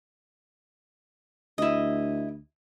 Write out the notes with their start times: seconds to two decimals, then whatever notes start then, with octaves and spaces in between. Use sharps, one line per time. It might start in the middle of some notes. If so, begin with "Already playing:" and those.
1.58 D2 E4 D#5